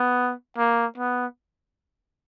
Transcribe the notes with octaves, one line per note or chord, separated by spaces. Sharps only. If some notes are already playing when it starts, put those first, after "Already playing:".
Already playing: B3
A#3
B3